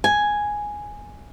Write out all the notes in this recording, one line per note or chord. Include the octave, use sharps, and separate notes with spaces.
G#5